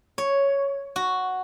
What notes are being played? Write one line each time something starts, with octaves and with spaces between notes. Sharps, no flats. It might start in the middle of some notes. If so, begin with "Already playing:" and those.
C#5
F#4